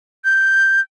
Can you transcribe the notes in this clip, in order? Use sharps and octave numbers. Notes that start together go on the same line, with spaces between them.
G6